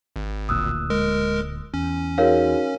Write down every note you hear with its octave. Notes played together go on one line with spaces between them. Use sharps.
G#1
D1 D2 A#2 D#6 E6 F#6
G#3 A#4
E2 C#4
D#4 F#4 G#4 A#4 C#5 F5